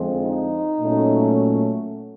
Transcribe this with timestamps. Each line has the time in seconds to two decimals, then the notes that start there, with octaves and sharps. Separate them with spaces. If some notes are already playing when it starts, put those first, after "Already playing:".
Already playing: F2 D3 F3 G#3 C4
0.21 D#4
0.80 A#2 F#3 A3 C#4